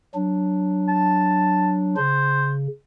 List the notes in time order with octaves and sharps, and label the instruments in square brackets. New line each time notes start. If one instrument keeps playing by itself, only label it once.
[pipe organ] F#3 D4
[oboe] A5
[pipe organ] C#3 [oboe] C5